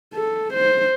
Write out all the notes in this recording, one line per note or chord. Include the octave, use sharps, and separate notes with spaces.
A4
C5